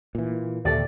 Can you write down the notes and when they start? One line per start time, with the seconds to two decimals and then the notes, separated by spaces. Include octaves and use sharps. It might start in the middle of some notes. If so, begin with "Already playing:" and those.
0.15 A#2 E3
0.65 D#2 A#2 D3 G4 A4 D5 E5